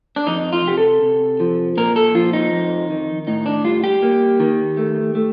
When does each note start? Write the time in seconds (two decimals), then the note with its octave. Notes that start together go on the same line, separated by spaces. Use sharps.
0.16 D4
0.27 F2 D#4
0.52 F4
0.65 C3 G4
0.77 A4
1.02 C3
1.40 F3
1.77 A#2 A#4
1.96 A4
2.15 F3 F4
2.33 D#4
2.52 F2
2.90 D#3
3.27 A2 D#4
3.46 D4
3.64 G3 F4
3.84 G4
4.02 A#3
4.40 D#3
4.77 A3
5.15 A3